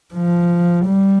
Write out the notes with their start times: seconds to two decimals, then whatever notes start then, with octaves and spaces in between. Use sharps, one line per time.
0.13 F3
0.86 G3